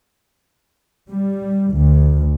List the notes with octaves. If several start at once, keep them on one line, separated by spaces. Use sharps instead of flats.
G3
D2